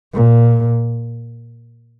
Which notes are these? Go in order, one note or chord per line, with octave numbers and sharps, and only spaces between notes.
A#2